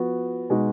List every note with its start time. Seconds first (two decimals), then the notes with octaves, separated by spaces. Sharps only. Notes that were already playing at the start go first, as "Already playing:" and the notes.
Already playing: F3 B3 F#4
0.50 B2 G#3 D#4 F#4